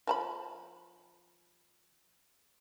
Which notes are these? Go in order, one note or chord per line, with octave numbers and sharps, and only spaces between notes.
F3 A5 B5